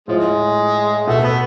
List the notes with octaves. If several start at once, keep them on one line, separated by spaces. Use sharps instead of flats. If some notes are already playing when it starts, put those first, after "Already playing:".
A2 F3 G#3
B2 A3
B3